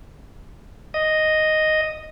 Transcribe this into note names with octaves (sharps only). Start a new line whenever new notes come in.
D#5